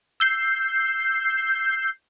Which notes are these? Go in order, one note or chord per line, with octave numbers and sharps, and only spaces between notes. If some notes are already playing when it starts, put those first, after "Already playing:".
E6 G6 C7